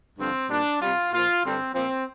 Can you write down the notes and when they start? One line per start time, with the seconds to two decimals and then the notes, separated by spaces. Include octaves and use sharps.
0.18 G2 D3 F3 C4
0.50 A#2 G3 D4
0.81 C3 G3 F4
1.12 A#2 F3 F4
1.44 G2 D3 G3 C4
1.74 A#2 F3 C4